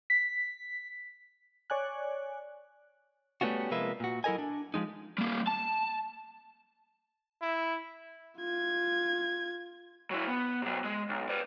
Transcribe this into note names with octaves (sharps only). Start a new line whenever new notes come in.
B6
C#5 D5 G#5 F#6
G3 A3 B3 C#4 F4 F#4
C3 F3 G#3 A#3 B4 E5
A#2 F#4
F#3 E4 A4 A#4 D#5 G#5
D4
F3 F#3 G#3 D#4
G3 A#3
A5
E4
F4 G#6
F#3 E4
B3
C3 F#3
G#3
B1
B4 D5